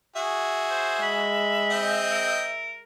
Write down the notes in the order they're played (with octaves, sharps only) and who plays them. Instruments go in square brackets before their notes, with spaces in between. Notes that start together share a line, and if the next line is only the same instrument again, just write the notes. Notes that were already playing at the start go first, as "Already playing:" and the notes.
[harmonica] F#4 G#4 [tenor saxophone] E5
[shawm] C5
[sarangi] G#3 [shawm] B5
[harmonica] C4 D#5 G5
[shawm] A#4